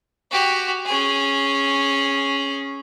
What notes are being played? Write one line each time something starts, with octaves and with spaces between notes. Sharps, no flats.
F#4 G4
C#4 G#4